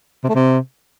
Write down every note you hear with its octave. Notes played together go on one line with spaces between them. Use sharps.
C3
A3
C3